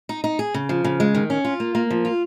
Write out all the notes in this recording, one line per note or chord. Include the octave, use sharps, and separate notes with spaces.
D#4
D#4
G#4
C#3
F3
C#3
G#3
D#3
C#4
F4
A#3
A#3
F3
F4